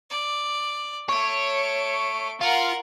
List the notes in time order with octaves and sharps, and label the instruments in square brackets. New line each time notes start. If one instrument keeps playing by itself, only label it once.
[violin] D5
[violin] A3 D7 [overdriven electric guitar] C#5
[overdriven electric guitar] F4 [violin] A#4 F#5